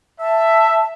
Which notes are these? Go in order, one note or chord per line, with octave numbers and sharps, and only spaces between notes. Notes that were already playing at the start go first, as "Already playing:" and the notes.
E5 A5